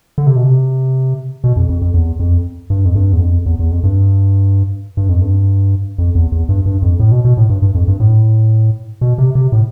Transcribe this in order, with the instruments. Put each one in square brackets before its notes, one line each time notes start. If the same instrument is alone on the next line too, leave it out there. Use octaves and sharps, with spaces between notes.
[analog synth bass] D3
C3
B2
C3
B2
F2
F2
F2
E2
F2
G2
F2
G2
E2
F2
E2
E2
F2
G2
G2
F2
G2
F2
E2
E2
G2
G2
F2
A2
B2
B2
A2
G2
G2
F2
G2
A2
B2
C3
C3
A2